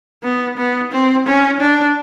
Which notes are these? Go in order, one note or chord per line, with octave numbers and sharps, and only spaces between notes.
B3
B3
C4
C#4
D4